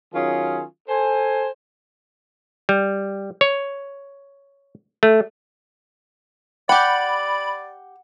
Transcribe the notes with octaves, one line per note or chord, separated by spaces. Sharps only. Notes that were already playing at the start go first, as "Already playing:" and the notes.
D#3 F#3 C#4 F4 G#4
A4 C5 G#5
G3
C#5
A3
G4 D5 F#5 G5 B5